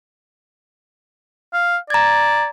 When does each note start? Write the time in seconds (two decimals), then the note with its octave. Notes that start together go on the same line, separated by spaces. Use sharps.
1.53 F5
1.90 D5 A#5 G#6